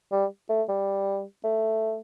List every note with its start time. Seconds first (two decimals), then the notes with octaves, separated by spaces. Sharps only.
0.12 G3
0.49 A3
0.69 G3
1.44 A3